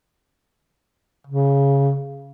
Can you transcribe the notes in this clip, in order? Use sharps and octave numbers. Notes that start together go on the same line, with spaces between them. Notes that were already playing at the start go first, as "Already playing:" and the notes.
C#3